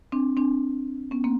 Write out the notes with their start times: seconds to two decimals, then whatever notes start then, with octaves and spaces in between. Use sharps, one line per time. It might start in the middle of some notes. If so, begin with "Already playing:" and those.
0.12 C4 D4
0.37 C4 D4
1.11 B3 C#4
1.24 A#3 C4